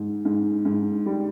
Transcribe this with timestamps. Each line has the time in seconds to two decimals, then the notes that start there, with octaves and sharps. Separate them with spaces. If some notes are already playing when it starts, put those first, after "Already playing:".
Already playing: G#2
0.25 G#2
0.65 G#2
1.06 G3